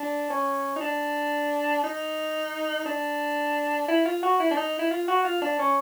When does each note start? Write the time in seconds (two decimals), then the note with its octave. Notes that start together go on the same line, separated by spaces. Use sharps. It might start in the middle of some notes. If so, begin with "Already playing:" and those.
Already playing: D4
0.30 C#4
0.76 D#4
0.81 D4
1.84 D#4
2.86 D4
3.88 E4
4.06 F4
4.23 F#4
4.40 E4
4.51 D4
4.57 D#4
4.79 E4
4.91 F4
5.08 F#4
5.25 F4
5.42 D4
5.59 C#4